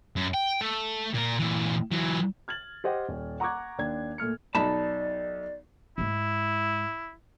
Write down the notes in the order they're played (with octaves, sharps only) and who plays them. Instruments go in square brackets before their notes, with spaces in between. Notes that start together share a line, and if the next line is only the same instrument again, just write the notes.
[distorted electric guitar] F#2
G5
A3
A#2 A#4
A#2 E3
E3 F#3
[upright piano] F6 G#6 A6 F#7
G4 C5 D#5 F#5 G5
D#1
F#5 A#5 C#6 D6 F#6 G#6
D#2 D4 G#6
A#2 A3 F6 C#7
[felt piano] B1 D#4 [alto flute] D5 [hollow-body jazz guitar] A5 B5
[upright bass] G#2 G#3 [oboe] E4